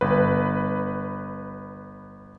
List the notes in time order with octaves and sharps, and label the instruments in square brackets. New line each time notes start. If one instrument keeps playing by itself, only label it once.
[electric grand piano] G1 B4